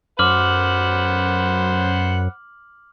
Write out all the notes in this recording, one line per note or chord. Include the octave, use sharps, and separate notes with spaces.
F#2 C5 F#5 B5 D6 F6 F#7